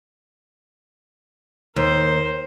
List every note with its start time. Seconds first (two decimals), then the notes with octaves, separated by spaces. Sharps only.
1.76 D#2 A#4 C5